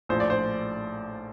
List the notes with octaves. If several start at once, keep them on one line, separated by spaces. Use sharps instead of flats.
A#1 A2 F3 C5
D5
C5